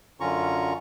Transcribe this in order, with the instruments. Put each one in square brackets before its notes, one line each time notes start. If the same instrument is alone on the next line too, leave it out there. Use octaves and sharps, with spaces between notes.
[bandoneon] F#2 D3 C#4 F4 A#5 C#6